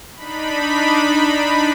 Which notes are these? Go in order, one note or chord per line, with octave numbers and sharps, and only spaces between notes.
D4 D#4 B5